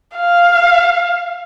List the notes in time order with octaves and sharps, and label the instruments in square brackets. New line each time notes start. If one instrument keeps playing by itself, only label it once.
[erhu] F5